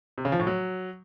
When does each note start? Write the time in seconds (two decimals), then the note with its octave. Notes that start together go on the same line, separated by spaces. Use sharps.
0.18 C3
0.25 C#3
0.32 F3
0.39 A2
0.47 F#3